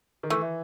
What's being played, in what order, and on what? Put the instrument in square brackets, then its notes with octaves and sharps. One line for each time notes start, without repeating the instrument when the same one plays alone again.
[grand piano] D#3
[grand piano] E3 [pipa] A3